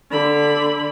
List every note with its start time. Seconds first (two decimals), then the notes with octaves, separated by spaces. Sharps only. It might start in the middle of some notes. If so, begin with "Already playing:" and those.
0.11 D3 B5